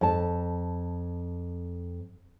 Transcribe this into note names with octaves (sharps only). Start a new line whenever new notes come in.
F2 A5